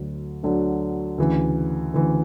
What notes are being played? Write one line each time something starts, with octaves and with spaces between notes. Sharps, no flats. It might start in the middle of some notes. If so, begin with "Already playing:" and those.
Already playing: D2 D3 F#3
D2 D3 F#3
D2 C#3 E3
D2 C#3 E3